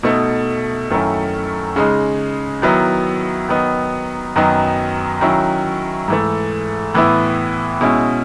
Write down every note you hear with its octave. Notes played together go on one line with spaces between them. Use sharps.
B2 A3 D#4
F#2 D#3 A3 C#4 E4
C#3 G#3 D#4
D#3 F#3 B3 E4
D#3 F#3 B3 D#4
F#2 D#3 F#3 B3 D#4
D#3 F#3 C#4 E4
G#2 E3 A3
A2 E3 B3 E4
B2 G#3 C#4 E4